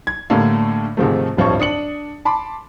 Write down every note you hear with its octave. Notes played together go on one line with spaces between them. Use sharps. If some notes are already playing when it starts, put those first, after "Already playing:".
G#6
A2 D3 G3 A3 A#3
G#2 C3 D#3 F3 G#3 A3
D1 G2 F3 C4 C#5 C#6
D4 D#6 C#7 F#7
A5 B5 C6 D6